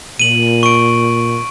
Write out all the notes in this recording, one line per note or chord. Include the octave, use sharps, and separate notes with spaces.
A#2 D#7 F#7
C#6 D7